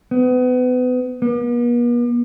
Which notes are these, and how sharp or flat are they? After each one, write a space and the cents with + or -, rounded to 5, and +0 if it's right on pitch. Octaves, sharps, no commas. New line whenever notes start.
B3 +30
B3 -45